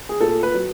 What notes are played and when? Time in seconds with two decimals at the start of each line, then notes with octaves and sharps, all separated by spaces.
0.09 G#4
0.20 A#2 A4
0.43 B4
0.54 F#3